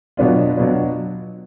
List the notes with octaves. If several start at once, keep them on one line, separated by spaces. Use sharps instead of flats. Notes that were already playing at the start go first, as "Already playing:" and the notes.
B2 F#3 B3 D4 F4
B2 F#3 B3 D4 F4